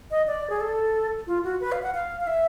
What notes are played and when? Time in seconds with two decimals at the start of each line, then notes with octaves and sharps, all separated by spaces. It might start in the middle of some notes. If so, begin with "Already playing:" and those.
0.11 D#5
0.27 D5
0.50 G#4
0.61 A4
1.27 F4
1.44 F#4
1.61 B4
1.72 F5
1.83 F#5
1.94 F5
2.21 F5
2.27 E5